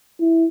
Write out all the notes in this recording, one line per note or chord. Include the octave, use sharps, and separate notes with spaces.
E4